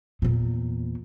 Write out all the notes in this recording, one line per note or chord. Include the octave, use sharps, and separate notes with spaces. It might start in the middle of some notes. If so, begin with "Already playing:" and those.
E2 A#2